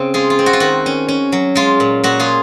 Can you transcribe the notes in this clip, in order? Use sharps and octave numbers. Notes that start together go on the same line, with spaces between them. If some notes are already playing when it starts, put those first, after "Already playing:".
Already playing: C#3 C4
G#3 F4 G#4
F4
C4
F#4
F4
D#3 F#4
C#4
C#4
F#3
G#3 F4
A#2
A#2 F#4
F4 G#4